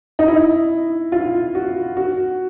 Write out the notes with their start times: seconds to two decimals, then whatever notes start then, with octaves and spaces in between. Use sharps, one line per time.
0.19 D#4
0.28 E4
1.12 F4
1.55 F#4
1.97 F#4